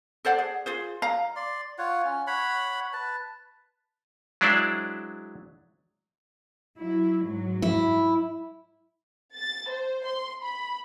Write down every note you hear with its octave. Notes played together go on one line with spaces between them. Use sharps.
A4 C5 D5 F#5
G#4
F4 G#4 C5
F5 A#5
D5 C6
F4 C#5 F#5
C#4
C#5 F#5 B5
B4 A5
F#3 G#3 D4 E4 C5 D5
F#3 E4
G#2 F#3
E4
A6
C5
C6
B5